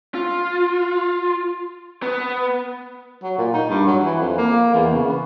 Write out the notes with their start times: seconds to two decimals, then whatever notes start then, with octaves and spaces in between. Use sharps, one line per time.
0.15 F4
2.02 B3
3.23 F#3
3.38 A#2
3.53 D#4
3.69 G2
3.87 F#3
4.03 E3
4.19 F2
4.38 A#3
4.74 E2
4.93 C#3
5.09 B3